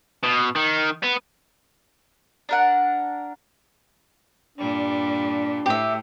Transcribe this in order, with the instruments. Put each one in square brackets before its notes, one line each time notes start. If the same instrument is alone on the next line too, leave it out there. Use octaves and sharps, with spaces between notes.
[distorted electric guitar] B2
D#3
B3
[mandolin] D4 A#4 F#5
[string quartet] G2 A#2 G3 [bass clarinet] D4
[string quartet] A2 [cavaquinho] G4 E5